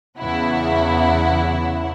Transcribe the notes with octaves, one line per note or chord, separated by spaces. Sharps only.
E2 C#3 E4 F#5